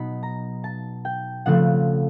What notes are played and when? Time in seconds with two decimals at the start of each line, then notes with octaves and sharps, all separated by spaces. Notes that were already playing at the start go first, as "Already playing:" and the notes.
Already playing: B2 F#3 B3 D#4 B5
0.23 A#5
0.64 A5
1.05 G5
1.46 C#3 F3 A3 C4 F#5